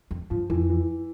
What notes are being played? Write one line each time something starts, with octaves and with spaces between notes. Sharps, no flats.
F2
G2 F3
F2 E3
E3